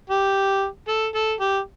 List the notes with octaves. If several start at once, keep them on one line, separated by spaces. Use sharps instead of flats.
G4
A4
A4
G4